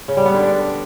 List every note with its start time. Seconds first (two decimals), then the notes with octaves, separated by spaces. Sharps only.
0.08 C#3
0.17 G3
0.26 B3
0.34 D3
0.43 D4